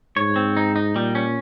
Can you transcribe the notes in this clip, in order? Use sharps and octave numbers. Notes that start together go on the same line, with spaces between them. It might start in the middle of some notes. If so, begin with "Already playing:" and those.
G#2 C#5
C4
D#4
D#4
A#2 G3
C#4